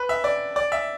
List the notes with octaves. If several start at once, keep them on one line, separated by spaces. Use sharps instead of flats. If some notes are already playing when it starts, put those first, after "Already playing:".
Already playing: B4
E5
D5
D5
E5